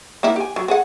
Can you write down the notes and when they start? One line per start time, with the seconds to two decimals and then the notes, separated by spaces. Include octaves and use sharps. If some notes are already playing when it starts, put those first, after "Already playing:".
0.23 A#3 D#4 E4
0.36 G4 G#5
0.56 F#3
0.68 C4 G#4 F#5